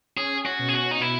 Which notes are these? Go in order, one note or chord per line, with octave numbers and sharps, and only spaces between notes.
C#4 G#4
F#4
B2
G#4
F#4
D#4
B2 E4